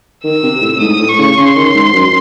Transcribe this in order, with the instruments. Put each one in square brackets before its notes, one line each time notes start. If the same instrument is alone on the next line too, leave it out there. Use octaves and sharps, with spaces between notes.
[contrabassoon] D#3 [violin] E6
[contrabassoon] C3
A2
[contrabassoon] G#2 [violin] D#6
[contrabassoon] A2
[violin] C#6
[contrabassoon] C#3
[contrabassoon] C#3 [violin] C6
[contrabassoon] D#3
G#2
F#2